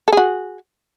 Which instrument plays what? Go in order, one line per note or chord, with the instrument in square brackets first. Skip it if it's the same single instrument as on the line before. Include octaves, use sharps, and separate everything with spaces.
[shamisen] A4
G#4
F#4